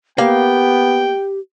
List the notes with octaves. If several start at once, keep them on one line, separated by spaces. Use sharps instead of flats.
A#3 B3 G4 F5 G5